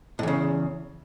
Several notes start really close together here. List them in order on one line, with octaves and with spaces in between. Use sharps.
A2 E2 C#3